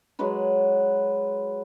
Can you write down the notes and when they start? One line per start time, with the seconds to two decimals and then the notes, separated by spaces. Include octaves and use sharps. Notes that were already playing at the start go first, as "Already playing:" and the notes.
0.19 F#3 G#3 F#4 B4